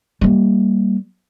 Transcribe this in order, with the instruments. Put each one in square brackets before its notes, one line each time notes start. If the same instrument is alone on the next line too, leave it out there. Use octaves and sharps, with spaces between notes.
[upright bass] G3 A#3